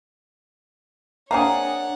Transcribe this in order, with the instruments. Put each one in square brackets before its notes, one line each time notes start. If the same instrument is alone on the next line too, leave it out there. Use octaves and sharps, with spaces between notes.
[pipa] A#3 C4 G#4 [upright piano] D4 E5 A#5 [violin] C#5 F#5